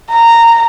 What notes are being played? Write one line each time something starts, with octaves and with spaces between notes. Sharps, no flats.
A#5